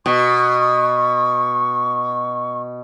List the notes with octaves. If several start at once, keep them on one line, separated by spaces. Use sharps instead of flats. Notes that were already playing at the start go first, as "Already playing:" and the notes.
B2 C#6